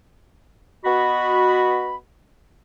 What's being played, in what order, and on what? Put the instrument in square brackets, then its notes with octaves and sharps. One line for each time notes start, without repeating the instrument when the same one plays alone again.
[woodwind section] B3 F#4 D#5 B5